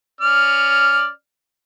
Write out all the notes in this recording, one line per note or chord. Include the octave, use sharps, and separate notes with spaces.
C#4 D5 F6